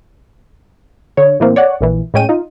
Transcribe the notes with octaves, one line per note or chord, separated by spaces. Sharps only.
D3 C#5
A2 E3 A#3 C4
C#5 D5 F#5
A#1 A#2 E3
A2 G#3 C#4 G5 D#7
D#4 F4